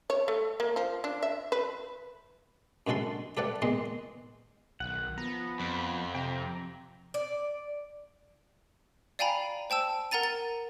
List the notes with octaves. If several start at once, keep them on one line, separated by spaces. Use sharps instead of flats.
C#5
A3
A#3
F3
D4
E5
B4
F#2 D3 G#3 F#4 A4 C6
G4 A4 B4 D5 F#5
E2 D#3 G#3 D#5 C6
B1 D#3 F#5
F3 B3 A#5
F2
C3 G5 A#5
D5
D5 F5 G5 G#5 A#5 B5
C5 G5 A5 E6
A#4 F#5 A#5 A6 D#7
A6